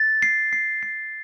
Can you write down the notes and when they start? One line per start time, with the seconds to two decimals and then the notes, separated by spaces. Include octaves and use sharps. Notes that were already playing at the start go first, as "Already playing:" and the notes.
Already playing: A6
0.22 C7
0.53 C7
0.83 C7